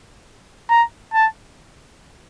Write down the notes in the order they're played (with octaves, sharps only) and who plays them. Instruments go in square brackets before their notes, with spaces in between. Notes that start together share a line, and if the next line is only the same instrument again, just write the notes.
[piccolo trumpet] A#5
A5